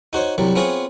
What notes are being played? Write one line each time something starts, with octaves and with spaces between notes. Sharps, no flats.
D#4 F#4 C5 C#5
C2 F#3 G3
B3 C4 F4 G#4 C#5